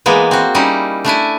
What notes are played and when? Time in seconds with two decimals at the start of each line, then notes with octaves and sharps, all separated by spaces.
0.06 E3 G#3 A#3 B3
0.31 C4 F#4
0.55 G3 C#4 D#4 E4
1.05 A3 D4 E4 G#5